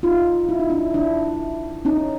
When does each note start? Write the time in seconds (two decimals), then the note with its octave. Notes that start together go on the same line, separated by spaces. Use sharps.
0.03 D#4 F4
0.49 E4
0.60 D#4
0.70 D4 E4
0.94 D4 E4
1.85 C#4 D#4